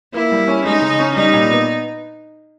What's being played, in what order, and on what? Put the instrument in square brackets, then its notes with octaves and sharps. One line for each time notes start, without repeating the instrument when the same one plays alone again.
[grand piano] A#3 [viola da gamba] E4
[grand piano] G3
C#4
[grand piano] G#3 [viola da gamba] D#4
[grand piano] C#3
C#4
[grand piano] G3 [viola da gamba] D#4
[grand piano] A#2
B3